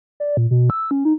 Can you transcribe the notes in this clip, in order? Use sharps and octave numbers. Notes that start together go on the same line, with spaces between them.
D5
A#2
B2
E6
C#4
D#4